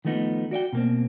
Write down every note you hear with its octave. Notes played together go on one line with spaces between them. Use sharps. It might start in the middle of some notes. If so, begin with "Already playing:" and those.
D#3 F3 A3 B3 D#4
F#4 D5 E5 G5
B2 A#3 C4